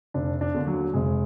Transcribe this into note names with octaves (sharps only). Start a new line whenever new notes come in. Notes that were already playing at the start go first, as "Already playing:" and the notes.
F1 D4
D4
D#2 D3
F#3
F1 G#3